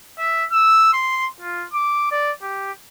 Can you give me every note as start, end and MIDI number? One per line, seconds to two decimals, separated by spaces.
0.19 0.45 76
0.52 0.89 88
0.93 1.25 84
1.41 1.65 65
1.73 2.07 86
2.12 2.32 74
2.42 2.72 67